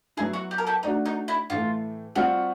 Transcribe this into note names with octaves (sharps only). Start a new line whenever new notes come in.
F#3 B3 E4 G#4
F#4
G4
A#4
G4 A4
A3 D4 D#4 F#4
D#4
E4
A2 E3 A3 F4
G3 C4 F4 F#4